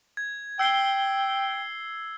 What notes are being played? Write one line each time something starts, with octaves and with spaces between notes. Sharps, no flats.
G#6
G5 E6 C7 G7